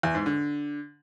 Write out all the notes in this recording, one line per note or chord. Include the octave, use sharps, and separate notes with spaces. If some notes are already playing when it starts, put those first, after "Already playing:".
E2
G#2
D3